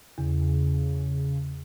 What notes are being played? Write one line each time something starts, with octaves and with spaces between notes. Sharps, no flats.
E2 C#3